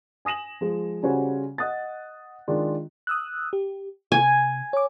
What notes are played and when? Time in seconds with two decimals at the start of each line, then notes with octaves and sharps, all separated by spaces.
0.25 G#5 D#6 A#6 E7 F#7
0.61 F3 G#3
1.03 C#3 G3 C#4 F#4 C5 G#5
1.58 D#5 F#5 D#6 F#6 A6
2.48 D#3 G#3 D4 F4
3.07 D#6 E6 F#6
3.53 G4
4.12 C3 G#5
4.73 C#5 D6